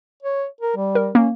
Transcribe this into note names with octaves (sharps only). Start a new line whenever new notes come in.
C#5
A#4
G3
A#4
A#3 C#4